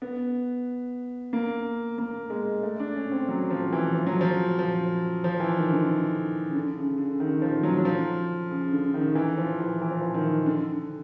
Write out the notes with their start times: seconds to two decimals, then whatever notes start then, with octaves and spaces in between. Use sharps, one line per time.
0.02 B3
1.33 A#3
1.98 A#3
2.30 G#3
2.63 A3
2.80 D4
2.96 C#4
3.12 C4
3.29 F#3
3.50 F3
3.72 E3
3.93 F3
4.07 F#3
4.21 F3
4.59 F3
5.24 F3
5.40 E3
5.57 D#3
5.73 D3
6.50 C#3
6.55 D3
6.77 C#3
6.98 D3
7.20 D#3
7.42 F3
7.63 F#3
7.78 F#3
7.85 F3
8.51 C#3
8.72 D3
8.94 D#3
9.15 E3
9.38 F3
9.60 E3
9.81 E3
9.91 F3
10.01 E3
10.14 D#3
10.46 D3